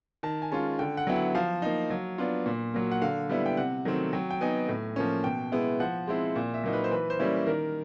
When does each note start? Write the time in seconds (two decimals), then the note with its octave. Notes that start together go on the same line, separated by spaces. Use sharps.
0.23 D#3 A5
0.42 G#5
0.51 G#3 C#4 F4 A5
0.79 D3 G5
0.97 F#5
1.07 F#3 B3 E4 G5
1.16 F#5
1.35 F3 F5
1.62 A#3 D#4
1.90 F#3
2.18 B3 D4 F4
2.46 A#2
2.74 F#3 A#3
2.91 F#5
3.02 D3 F5
3.29 G3 B3 E4
3.46 G5
3.57 C3 F#5
3.85 D#3 F#3 A3 C4
4.13 F#3 G5
4.31 G5
4.41 B3 D#4 G#5
4.69 A2
4.96 F3 A#3 C#4
5.24 B2 G5
5.52 G#3 B3 E4
5.80 F3 F#5
6.07 G#3 C4 E4
6.36 A#2
6.54 E5
6.64 F#3 A#3 D#4
6.73 B4
6.84 C5
6.91 E3 B4
7.10 C5
7.19 G3 A#3 C#4 E4
7.47 D#3 A#4